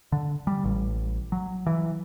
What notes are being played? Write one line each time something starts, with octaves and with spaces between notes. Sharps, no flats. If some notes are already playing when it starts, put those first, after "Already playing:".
D3
G3
A1
F#3
E3